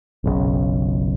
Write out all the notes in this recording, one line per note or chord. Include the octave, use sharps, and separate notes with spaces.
F#1 B1 C#3